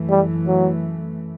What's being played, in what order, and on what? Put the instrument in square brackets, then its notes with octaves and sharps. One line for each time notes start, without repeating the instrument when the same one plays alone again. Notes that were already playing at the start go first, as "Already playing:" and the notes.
Already playing: [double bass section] F#2 E3 A3
[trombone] G3
F#3